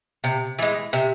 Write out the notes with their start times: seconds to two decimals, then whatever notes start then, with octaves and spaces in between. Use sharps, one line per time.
0.24 C3
0.59 E3 G#3
0.93 C3